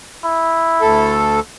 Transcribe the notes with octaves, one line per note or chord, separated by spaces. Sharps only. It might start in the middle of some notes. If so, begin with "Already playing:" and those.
E4
D2 A4